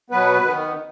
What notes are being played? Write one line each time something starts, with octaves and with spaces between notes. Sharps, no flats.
B2 F#3 B3 B4
D#3 B3